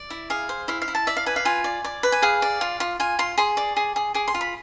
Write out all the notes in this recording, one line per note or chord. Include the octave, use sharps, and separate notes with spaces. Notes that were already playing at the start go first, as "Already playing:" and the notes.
Already playing: D5
E4
G#4 F5
C5
E4 F5
F5
E4
A5
D5 E5
F5
B4 G#5
F5
F4 G#5
D5
D5
B4
G#5
G#4 F5
D5
F4
F4
F4 G#5
F4 C6
G#4 C6
D5
G#4
G#4
G#4 D6
C6
F4
B5